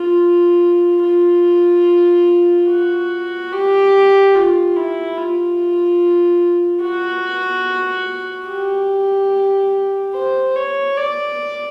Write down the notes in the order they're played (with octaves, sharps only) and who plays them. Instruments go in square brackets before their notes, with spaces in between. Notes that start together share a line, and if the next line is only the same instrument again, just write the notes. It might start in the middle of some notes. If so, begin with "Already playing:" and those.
Already playing: [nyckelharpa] F4
F4
F#4
G4
F4
E4
F4
F#4
G4
C5
C#5
D5